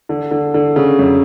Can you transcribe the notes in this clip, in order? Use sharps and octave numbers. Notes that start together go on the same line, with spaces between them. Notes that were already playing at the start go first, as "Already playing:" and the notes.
D3
D3
D3
C#3
F#2